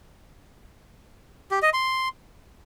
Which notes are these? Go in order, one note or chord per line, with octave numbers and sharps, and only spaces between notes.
G4
D#5
C6